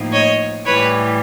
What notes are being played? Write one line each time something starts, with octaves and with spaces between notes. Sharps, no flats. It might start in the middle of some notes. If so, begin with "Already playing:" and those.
Already playing: A2 F3 A#3 D#4
C#5 D#5
A2 E3 G3 B4 C#5